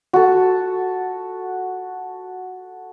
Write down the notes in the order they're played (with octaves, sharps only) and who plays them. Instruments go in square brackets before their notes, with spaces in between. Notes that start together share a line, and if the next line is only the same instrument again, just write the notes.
[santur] F#4 A4